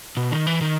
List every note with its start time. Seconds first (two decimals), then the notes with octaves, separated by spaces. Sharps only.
0.17 B2
0.31 D#3
0.47 E3
0.61 D#3